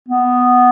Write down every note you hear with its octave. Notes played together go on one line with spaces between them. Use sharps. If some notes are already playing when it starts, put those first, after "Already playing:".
B3